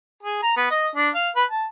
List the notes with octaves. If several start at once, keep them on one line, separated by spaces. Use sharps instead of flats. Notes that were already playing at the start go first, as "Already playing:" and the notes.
G#4
A#5
B3
D#5
D4
F5
B4
A5